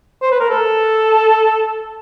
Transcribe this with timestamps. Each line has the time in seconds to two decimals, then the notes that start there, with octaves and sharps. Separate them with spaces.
0.22 C5
0.32 B4
0.40 A#4
0.50 A4